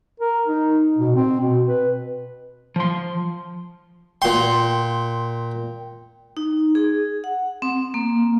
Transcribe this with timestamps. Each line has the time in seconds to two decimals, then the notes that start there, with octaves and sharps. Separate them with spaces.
0.20 A#4
0.47 D#4
0.98 B2
1.15 C4
1.40 B2
1.68 B4
2.76 F3 C6
4.22 A#2 G5 C6
6.37 D#4
6.75 G#4
7.24 F#5
7.62 C4
7.94 A#3